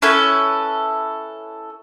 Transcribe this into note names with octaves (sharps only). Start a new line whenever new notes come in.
C#4 E4 A4 B4